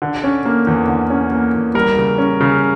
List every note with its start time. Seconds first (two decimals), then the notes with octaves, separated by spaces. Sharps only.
0.02 D3
0.24 C#4
0.45 A#3
0.67 E2
0.88 D3
1.10 C#4
1.31 A#3
1.54 E2
1.75 G3 A#4
1.97 C#3
2.18 C#4
2.41 C#3